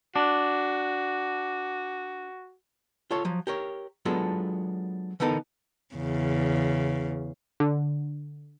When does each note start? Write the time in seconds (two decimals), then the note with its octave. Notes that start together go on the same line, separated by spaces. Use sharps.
0.16 D4 F#4
3.11 F4 A4 C#5
3.25 F3 F#3
3.47 G4 A#4 C#5
4.05 F#3 G#3 B3 D4 F4 A4
5.20 D3 E3 B3 D#4 A4 A#4
5.96 E2 C#3
7.60 D3